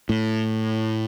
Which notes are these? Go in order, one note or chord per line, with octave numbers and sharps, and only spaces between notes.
A2